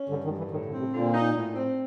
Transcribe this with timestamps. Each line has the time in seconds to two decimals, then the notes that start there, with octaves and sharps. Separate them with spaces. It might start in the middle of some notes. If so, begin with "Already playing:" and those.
Already playing: C#4
0.09 G2 D3
0.24 D#3
0.30 G2
0.38 E3
0.51 A2 D#3
0.65 D3
0.72 C4
0.79 C3
0.93 A#2 D3
1.14 D#4
1.34 A2
1.55 C4